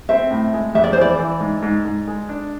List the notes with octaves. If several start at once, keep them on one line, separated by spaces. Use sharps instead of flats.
C4 E5
A2
G#3
F2 E5
D5
C5
E3 D5
E3
G#2
G#2
G#2
G#3
D4